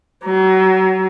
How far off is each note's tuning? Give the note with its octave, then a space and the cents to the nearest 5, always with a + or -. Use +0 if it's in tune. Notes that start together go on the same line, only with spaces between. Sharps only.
F#3 +30